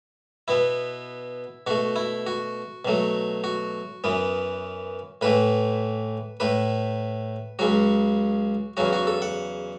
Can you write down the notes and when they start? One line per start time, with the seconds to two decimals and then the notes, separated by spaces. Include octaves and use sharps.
0.48 B2 B3 E4
1.67 B2 A3 F#4
1.96 E4
2.27 F#4
2.85 B2 F#3 A3
3.44 F#4
4.04 F#2 E3 B3
5.21 A2 E3 A3 B4
6.40 A2 A3 B4
7.59 C#2 C#3 F#3 F#4
8.77 E2 C#3 F#3 F#4
8.93 F#4
9.07 A4
9.22 F#5